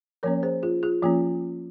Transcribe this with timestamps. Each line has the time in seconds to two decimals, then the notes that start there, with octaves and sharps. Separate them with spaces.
0.23 F3 A#3 C#4 A#4 C#5
0.43 G#4 C5
0.63 F4 G#4
0.83 F4 G#4
1.03 F3 A#3 C#4 F4